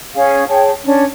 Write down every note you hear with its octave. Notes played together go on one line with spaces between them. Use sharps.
C#4 G#4 F5
G#4 C#5 G5 A5
C#4 D4